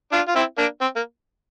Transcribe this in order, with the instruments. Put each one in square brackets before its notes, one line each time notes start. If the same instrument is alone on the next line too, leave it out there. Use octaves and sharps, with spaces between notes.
[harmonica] D4 F4
F4
C4 E4
A#3 D4
C4
A#3